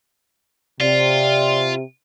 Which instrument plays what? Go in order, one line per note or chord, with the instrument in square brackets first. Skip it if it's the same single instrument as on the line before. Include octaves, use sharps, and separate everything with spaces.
[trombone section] C3 [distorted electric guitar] F4 [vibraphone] D5